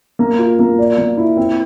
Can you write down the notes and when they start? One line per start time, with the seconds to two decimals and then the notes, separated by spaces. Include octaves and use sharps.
0.19 A#3
0.39 F4
0.59 A#3
0.78 D5
0.98 A#3
1.17 E4
1.37 C4